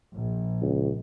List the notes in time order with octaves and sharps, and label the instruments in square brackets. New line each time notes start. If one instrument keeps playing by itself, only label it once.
[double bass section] A#1
[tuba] C#2